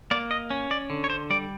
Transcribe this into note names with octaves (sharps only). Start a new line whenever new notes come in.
A#3 D5
D#5
C#4
D5
D3
C#5
C5
G3 D5